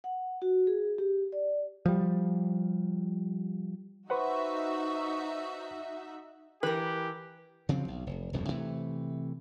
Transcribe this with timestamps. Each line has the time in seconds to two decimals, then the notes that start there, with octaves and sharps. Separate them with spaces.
0.04 F#5
0.42 F#4
0.67 G#4
0.98 G4
1.32 D5
1.86 F3 G3
4.10 D#4 F#4 B4 C5 E5 F#5 C#6
6.63 E3 G4 A#4 B4
7.69 C#3 F3 F#3 C4
7.88 B1
8.07 F1
8.33 D#1 F#2 B2
8.49 C3 E3 A3